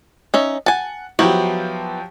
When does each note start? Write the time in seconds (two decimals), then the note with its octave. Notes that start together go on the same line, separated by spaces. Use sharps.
0.34 C#4 D#4 E5
0.66 F#5 G#5 A5
1.19 F3 F#3 B3 E4 F#4 G4